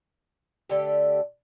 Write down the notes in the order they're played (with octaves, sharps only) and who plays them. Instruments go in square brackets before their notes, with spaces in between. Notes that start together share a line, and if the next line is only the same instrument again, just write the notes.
[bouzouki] D3 A3 D4 G4